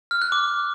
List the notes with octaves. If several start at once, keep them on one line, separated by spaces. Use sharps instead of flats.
F6
F#6
D6